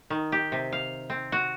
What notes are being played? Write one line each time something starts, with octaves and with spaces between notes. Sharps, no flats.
D#3
G4
C3
F5
C4
F#4